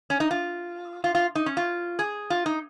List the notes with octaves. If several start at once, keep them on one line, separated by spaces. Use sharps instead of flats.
C#4
D#4
F4
F4
F4
D#4
C#4
F4
G#4
F4
D#4